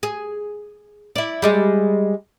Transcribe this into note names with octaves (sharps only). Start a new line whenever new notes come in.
G#4
E4 D5
G3 G#3 G#4